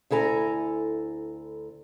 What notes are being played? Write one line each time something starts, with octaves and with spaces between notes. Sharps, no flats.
D2 E4 A4 G#5 A#5